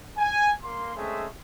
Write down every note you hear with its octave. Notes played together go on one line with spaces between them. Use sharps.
G#5
A#3 C6
G#3 A3 C4 C#4 G#4 E5